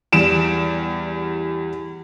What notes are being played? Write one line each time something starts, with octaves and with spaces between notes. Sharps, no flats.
E2 G3 D7 E7